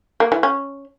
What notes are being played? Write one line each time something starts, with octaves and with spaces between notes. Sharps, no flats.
A#3
E3
C#4